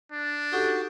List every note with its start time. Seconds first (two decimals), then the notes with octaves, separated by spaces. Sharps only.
0.12 D4
0.52 D#4 F#4 G4 A4